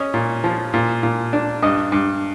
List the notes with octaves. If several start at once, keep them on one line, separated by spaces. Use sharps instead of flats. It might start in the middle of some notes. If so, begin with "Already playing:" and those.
Already playing: C#4 D#5
A#2
F3
A#2
A#2
D4
G2 D#5
G2